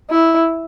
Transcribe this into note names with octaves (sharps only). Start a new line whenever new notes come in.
E4